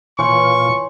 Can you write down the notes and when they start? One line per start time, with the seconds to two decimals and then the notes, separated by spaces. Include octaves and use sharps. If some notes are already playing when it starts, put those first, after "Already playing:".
0.19 A#2 E3 F4 C#5 G#5 C6 C#6